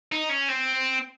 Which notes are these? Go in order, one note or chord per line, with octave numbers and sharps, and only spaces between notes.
D#4
C#4
C4